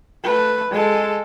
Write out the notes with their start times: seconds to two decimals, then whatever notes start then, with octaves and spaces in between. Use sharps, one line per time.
0.24 A3 B4
0.70 G#3 A4